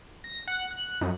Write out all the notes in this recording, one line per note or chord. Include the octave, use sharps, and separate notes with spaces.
A#6
F#5
F#6
F#2